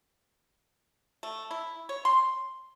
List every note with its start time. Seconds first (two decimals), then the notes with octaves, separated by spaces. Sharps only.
1.23 A3
1.51 E4
1.89 C#5
2.05 C6